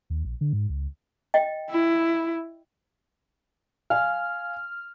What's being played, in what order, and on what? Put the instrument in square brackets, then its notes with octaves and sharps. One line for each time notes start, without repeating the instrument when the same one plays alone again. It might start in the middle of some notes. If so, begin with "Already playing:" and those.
[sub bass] D#2
A#1
D3
G#2
C#2
[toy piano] D#5 G5
[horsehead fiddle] E4
[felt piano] F5 G#5 [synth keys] F6